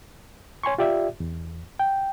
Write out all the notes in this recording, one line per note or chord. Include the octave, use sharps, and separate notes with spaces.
C#5 G#5 C6 C#6
F4 G4 D5 E5
E2
G5